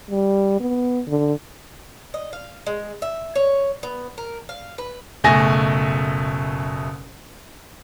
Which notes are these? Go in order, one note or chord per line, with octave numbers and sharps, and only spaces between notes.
G3
B3
D3
D#5
F5
G#3
E5
C#5
B3
A#4
F5
B4
F#1 B2 A3 G#5 A#6